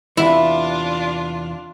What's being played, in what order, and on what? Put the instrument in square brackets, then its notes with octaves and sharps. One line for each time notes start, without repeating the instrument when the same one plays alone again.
[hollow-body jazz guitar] E2 C3 E3 [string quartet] D4 F4 [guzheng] E4